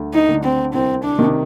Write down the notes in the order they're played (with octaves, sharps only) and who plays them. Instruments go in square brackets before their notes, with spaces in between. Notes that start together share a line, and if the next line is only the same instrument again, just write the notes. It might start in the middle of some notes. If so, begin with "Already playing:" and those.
Already playing: [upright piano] D2 D3 A3 D4
[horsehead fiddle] D#4
[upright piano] D3 A3 D4
[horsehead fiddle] C4
[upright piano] C2 [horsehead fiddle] C4
[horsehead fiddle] D4
[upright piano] C3 D#3